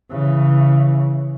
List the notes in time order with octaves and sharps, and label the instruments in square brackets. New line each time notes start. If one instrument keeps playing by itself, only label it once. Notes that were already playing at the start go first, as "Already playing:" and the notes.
[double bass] C#3 E3